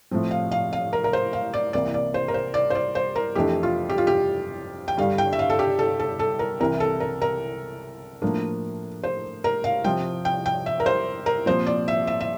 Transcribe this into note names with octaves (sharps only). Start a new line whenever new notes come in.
A2 F3 C4
F5
F5
F5
A#4
A#4
C5
F5
D5
C2 C3 E3 A#3 D5
D5
C5
A#4
C5
D5
C5
D5
C5
A#4
F2 E3 A3 D4 G4
F4
G4
F4
G4
G5
G2 D3 G3 F5
G5
E5
F5
A4
G4
A4
A4
A4
A#4
C2 C3 E3 A#4
A4
A#4
A#4
A2 F3 A#3 D4
C5
A#4
F5
C3 F3 C4 G5
G5
G5
E5
A#4
C5
A#4
A#2 F3 C4 C5
D5
E5
E5
E5